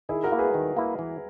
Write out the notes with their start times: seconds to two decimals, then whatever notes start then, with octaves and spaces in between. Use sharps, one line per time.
0.09 D#3 E4 G#4
0.24 F#4 A#4
0.32 A#3 E4
0.39 G#4 B4
0.54 D#3
0.77 A#3 E4
0.99 E3